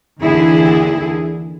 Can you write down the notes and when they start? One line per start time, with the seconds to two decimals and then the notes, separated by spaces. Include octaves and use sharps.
0.20 D#2 D3 E3 E4 G#4